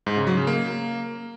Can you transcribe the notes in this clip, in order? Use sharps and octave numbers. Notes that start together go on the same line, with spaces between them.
G#2
C#3
F#3
C#3
A#3